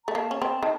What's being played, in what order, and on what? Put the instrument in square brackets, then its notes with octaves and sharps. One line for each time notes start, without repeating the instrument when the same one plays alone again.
[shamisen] A3 [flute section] A#5
[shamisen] A#3 [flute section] A5
[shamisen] C#4
C4
D#3